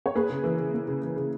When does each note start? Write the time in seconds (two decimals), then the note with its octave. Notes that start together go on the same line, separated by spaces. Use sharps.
0.06 C#5
0.15 A#3 G#4 B4
0.30 C#3
0.44 E3
0.59 C#3
0.73 A#3
0.88 C#3
1.02 E3
1.16 C#3